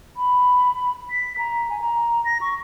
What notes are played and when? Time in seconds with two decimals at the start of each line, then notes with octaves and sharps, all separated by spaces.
0.17 B5
1.10 B6
1.38 A#5
1.70 G#5
1.81 A#5
2.25 A#6
2.41 C#6